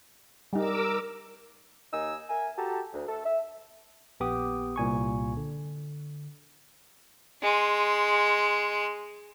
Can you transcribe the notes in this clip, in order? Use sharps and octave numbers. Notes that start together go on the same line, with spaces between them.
G3 D#4 A#4 D6 E6
D#2 A#3 D#4 G#5 E6
A#4 E5 G#5
F#4 G4 A4 A5 A#5
D2
A3 A4
E5
A#1 B3 G4 D6 D#6
C2 A#2 G#5 C#6
D3
G#3 C6